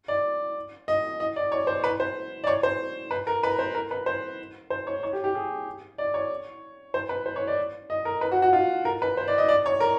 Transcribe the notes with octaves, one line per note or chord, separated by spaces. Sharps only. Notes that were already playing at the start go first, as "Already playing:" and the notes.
D5
D#5
D#5
D5
C#5
C5
B4
C5
D5
C#5
C5
B4
A#4
B4
C5
A#4
B4
C5
C5
C#5
C#5
G4
G4
G#4
D5
C#5
C5
B4
C5
C#5
D5
D#5
A#4
B4
F#4
F#4
F4
A#4
B4
C5
D5
D#5
D5
C#5
A#4